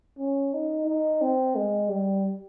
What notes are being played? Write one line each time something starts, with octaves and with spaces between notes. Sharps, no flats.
C#4
D#4
D#4
C4
G#3
G3